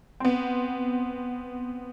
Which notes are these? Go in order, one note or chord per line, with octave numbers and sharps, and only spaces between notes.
B3 C4